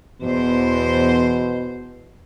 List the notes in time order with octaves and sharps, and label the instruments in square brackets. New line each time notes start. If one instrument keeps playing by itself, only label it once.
[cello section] E2 C5 [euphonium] B2